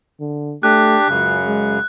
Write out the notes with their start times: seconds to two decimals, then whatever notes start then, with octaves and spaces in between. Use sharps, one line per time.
0.20 D3
0.63 A3 D4 G4 F#6
1.09 C#2 F#2 C#3
1.46 G#3